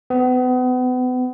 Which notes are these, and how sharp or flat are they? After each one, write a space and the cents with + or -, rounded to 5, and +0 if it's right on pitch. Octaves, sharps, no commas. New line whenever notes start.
B3 +35